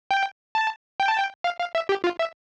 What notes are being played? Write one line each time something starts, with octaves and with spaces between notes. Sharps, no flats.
G5
A5
G5
A5
G5
F5
F5
E5
G4
F4
E5